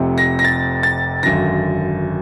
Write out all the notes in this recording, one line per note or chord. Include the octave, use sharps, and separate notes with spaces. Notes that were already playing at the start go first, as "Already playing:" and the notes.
Already playing: F1 F2 C3
A#6
A#6
A6
A6
G#1 F#2 D3 A#6